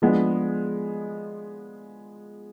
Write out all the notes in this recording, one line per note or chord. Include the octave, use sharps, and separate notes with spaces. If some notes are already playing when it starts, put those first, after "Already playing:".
F3 G#3 B3 D4